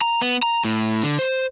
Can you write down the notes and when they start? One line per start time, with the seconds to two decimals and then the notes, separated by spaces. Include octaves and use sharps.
0.01 A#5
0.22 B3
0.43 A#5
0.64 A2
1.03 D3
1.19 C5